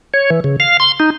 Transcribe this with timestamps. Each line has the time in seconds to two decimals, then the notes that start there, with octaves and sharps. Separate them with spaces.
0.14 C#5
0.30 E3
0.44 C#3
0.60 F5
0.80 C6
1.00 D#4